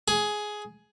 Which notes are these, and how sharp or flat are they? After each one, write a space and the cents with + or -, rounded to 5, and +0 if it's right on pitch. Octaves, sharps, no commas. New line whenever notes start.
G#4 +10